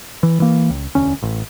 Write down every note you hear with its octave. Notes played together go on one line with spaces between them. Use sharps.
E3
E3 A#3
C#2
E1 D2 C#4
A1